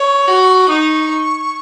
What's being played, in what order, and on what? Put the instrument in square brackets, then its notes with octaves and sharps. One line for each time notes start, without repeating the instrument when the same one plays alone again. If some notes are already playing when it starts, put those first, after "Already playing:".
Already playing: [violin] C#5 [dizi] C#6
[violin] F#4
[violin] D#4 [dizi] C#6 D#6